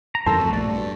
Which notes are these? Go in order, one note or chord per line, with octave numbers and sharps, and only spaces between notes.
A#5
E2 G2 C#3 A4 A#4 C5 A5
F2 A3 F#4
A#1 D5
G2